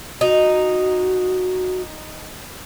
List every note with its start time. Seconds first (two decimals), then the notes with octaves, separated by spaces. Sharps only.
0.21 D#4 F#4